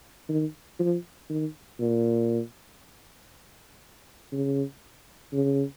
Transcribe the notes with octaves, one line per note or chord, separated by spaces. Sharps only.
D#3
F3
D#3
A#2
C#3
C#3